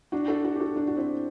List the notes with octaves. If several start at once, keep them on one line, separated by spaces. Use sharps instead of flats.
D4 F#4
F#4 A4
F#4 A4
G4
F#4 A4
D4 F#4
F#4
C4 E4